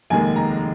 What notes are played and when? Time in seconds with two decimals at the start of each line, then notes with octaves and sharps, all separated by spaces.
0.10 F1 D#2 D#3 G#3 G#5
0.36 A#5